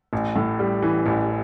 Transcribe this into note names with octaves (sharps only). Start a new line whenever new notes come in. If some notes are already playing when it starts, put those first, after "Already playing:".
A1
A2
G3
E3
A1